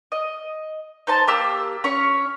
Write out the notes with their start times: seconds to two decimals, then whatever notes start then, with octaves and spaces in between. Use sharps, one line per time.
0.12 D#5
1.07 D#4 C5 A5
1.27 A#3 G4 E6
1.84 C#4 C#5 C#6